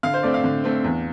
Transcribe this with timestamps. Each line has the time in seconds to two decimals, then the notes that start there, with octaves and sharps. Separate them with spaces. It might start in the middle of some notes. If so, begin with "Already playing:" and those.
0.03 D3 F5
0.14 C5
0.23 A3 C4 D5
0.34 F5
0.44 D3
0.64 A3 C4
0.84 E2